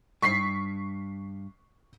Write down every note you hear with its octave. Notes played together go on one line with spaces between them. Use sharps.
G2 C#6 B6 C7